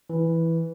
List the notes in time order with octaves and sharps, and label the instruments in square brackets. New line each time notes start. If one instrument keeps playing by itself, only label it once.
[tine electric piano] E3